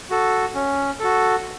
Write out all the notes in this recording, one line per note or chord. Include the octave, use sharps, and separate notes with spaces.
F#4 A4
C#4
F#4 A4